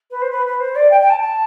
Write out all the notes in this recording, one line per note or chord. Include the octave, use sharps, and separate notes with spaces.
B4
C5
B4
B4
C5
D5
G5
G5
A5
A5